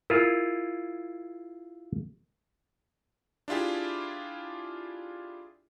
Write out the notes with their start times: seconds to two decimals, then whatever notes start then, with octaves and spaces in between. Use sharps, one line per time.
0.10 E4 F4 G#4 A#4
3.48 D4 E4 F4 G4 G#4